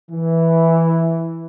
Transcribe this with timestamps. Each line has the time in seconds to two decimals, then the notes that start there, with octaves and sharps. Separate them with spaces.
0.11 E3